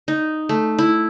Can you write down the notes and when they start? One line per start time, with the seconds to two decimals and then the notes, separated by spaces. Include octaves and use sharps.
0.08 D#4
0.49 A3
0.79 E4